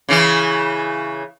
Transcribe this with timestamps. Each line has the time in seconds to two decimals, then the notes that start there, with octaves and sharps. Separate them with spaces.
0.09 C#3 E3 E4